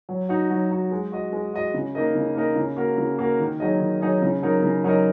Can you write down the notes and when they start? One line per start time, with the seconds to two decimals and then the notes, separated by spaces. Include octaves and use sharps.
0.09 F#3
0.29 D#4 F#4
0.50 F#3
0.71 D#4 F#4
0.91 G#3
1.12 F#4 D#5
1.32 G#3
1.54 F#4 D#5
1.74 C#3
1.95 A#3 D#4 A#4 D#5
2.15 C#3
2.36 A#3 D#4 A#4 D#5
2.56 C#3
2.76 A#3 F#4 A#4
2.98 C#3
3.19 A#3 F#4 A#4
3.40 D#3
3.60 F#3 D#4 G#4 D#5
3.80 D#3
4.01 F#3 D#4 G#4 D#5
4.22 C#3
4.42 F#3 D#4 A#4 D#5
4.62 C#3
4.84 F#3 D#4 A#4 D#5